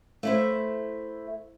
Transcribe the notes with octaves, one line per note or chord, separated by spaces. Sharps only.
A3 E4 C5